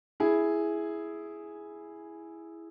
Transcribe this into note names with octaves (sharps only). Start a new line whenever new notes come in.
E4 G#4